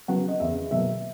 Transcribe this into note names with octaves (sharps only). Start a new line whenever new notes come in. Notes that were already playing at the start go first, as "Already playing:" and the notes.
C#3 F#3 B3 F#5
D#5
E2 C#3 E3 E5
B2 F#3 A#3 E5